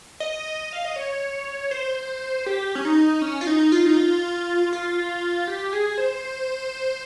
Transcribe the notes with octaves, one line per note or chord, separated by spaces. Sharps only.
D#5
F5
D#5
C#5
C5
G4
C#4
D#4
C#4
F4
D#4
F4
D#4
F4
F4
G4
G#4
C5